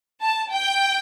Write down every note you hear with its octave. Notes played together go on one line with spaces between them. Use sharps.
A5
G5